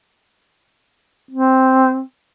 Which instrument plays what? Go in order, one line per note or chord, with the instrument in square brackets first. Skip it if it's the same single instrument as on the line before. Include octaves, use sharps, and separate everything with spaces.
[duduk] C4